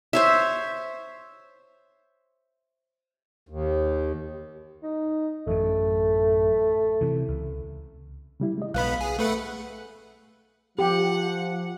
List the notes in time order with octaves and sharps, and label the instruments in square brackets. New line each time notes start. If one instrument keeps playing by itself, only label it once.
[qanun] C5 C#5 E5
[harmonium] D#2
[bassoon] D#4
[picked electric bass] A1 F#2 [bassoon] A3
[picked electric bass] C3 E3
C#2
[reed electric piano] C#3 G3 E4
G#3 D#5
[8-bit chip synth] B1 B3 B5 [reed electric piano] F5 F#6
[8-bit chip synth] G#4
A3 B4 F#5
[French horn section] F3 [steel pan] G4 [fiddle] F#5